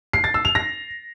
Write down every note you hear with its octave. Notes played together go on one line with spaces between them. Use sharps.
C7
A6
E6
F7
A#6